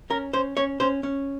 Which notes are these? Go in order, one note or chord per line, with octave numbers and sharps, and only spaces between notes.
C#4 A#4
C#4 C5
C#4 C#5
C#4 C5
C#4